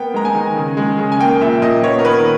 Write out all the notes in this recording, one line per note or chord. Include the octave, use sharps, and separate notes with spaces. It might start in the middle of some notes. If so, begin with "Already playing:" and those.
Already playing: A#3 B3 G5
G#3 A#5
G#5
D#3
C#3
G#3
C#3
G#5
A#3 G5
A#2 E5
A#2 D#5
B3 C#5
A#4
D#3 B4